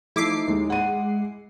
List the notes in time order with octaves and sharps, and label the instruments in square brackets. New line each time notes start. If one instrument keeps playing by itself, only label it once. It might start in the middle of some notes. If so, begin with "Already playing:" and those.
[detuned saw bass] F3 [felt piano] A3 D#4 [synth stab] E4 D6 C7
[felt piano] D#2 [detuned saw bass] G#3
[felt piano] F#5 D#7